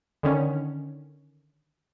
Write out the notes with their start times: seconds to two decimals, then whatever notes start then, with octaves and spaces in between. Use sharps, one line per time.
0.23 D3 D#3 C#4